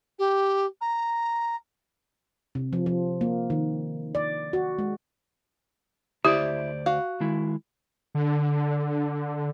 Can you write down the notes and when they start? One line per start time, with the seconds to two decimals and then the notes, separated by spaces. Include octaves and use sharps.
0.19 G4
0.81 A#5
2.55 C3
2.73 F3
2.86 F3
3.21 A#3
3.50 D#3
4.15 D5
4.53 F#4
4.79 G#3
6.25 D2 E4 G4 C5 D5
6.86 F#4 F5
7.20 D#3 G#3 E4
8.15 D3